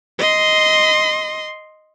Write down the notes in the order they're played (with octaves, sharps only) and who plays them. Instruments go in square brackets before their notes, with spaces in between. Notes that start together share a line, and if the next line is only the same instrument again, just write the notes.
[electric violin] D#5 C6